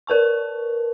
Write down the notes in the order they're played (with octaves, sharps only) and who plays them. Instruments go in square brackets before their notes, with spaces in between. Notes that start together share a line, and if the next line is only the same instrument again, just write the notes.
[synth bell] A#4 B4 A5 C#6